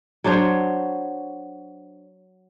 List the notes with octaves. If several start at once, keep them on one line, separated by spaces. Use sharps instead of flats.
F#3 D4 C5 C#5